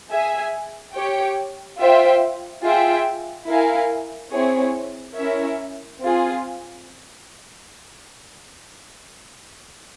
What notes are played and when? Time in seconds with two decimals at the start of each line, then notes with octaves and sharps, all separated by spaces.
0.10 G#4 E5 G#5
0.94 G4 C#5 G5
1.79 F4 C5 E5 G5
2.63 F4 G#4 E5 G5
3.48 E4 A#4 F5 G#5
4.32 C4 E4 G#4 C#5
5.16 C#4 E4 A#4 C#5 E5
6.01 C4 F4 G#4